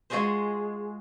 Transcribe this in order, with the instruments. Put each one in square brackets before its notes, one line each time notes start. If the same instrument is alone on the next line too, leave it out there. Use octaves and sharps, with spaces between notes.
[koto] G#3 F4 F#4 G#4 C5